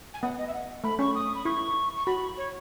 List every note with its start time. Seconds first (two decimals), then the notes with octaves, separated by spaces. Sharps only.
0.14 G#5
0.22 B3 F#5
0.38 D#5
0.47 E5
0.53 F#5
0.84 A3 B5
0.99 C#4 C#6
1.15 D#6
1.35 B5
1.45 E4 C#6
1.97 C#6
2.06 F#4 B5
2.37 C#5